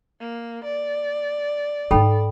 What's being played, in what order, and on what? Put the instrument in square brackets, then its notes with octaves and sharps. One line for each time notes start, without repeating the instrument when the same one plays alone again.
[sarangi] A#3
D5
[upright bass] G#2 D#4 [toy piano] A4 G5 B5